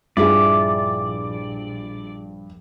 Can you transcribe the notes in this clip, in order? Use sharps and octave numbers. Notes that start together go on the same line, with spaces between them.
A#1 G2 E4 F4 G#4 D5